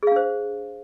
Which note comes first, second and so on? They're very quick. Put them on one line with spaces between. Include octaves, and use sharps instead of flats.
G#4 F5 D4 C5